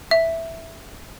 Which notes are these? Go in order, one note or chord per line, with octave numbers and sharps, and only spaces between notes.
E5